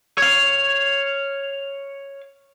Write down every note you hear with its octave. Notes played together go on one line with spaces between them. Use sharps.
C#5 F5